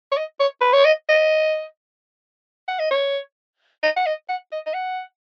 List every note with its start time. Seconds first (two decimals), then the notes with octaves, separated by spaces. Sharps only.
0.12 C#5
0.17 D#5
0.40 C#5
0.61 B4
0.73 C#5
0.85 D#5
1.09 D#5
2.68 F#5
2.79 D#5
2.91 C#5
3.83 D#5
3.96 F#5
4.06 D#5
4.29 F#5
4.52 D#5
4.66 D#5
4.74 F#5